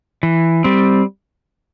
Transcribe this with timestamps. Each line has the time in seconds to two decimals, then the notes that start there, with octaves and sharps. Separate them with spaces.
0.23 E3
0.64 G3 C4